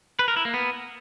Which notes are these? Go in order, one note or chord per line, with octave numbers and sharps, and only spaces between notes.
B4
A#4
E4
A#3
B3